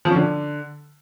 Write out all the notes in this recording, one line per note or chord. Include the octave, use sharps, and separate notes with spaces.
F3
C#4
D3